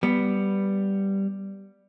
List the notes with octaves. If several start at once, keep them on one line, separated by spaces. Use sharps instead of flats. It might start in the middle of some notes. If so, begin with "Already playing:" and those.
G3 B3